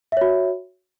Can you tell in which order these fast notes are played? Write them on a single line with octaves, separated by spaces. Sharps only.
E5 C#5 F#4